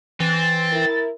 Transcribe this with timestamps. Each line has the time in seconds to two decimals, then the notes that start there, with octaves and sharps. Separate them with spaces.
0.20 E3 C4 A6
0.71 E4 A#4